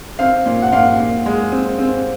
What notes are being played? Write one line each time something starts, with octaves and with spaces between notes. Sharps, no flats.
C4 F5
A#2
F#5
A#2 F5
A#2
G#3
C4
C4